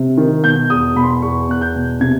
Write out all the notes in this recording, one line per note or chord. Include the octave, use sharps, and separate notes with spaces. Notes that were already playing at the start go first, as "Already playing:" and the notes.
Already playing: C3
D#3
B2 G6
E2 D#6
B2 B5
C6
B5
E2 C#6
E2 F#6
G6
B2
C3 G#6